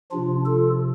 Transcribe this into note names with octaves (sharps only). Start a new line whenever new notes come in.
C3 F3 D4 F4
F4 A4